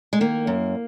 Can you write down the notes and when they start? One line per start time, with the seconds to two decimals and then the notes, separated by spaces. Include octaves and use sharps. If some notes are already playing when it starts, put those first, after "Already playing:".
0.13 G#3
0.21 D#3 A#3
0.47 F#2